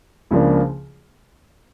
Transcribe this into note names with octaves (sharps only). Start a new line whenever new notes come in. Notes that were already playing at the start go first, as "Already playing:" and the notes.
C#2 C#3 F3 A#3 D4